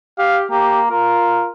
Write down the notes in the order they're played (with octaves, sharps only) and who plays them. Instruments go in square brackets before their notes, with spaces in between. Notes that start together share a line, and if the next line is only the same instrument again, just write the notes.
[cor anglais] G4 [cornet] F5
[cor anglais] A#3 [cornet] G4
[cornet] F4 [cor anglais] A#4